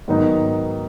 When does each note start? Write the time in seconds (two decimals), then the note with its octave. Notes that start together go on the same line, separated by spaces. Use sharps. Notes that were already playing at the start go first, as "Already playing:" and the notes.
0.08 G#2 D#3 F#3 B3 D#4